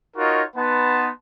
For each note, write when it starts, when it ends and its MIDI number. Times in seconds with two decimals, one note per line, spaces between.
0.17 0.42 63
0.17 0.42 65
0.17 0.42 66
0.17 0.42 70
0.17 0.42 73
0.17 0.42 75
0.56 1.09 59
0.56 1.09 63
0.56 1.09 71
0.56 1.09 78
0.56 1.09 81
0.56 1.09 84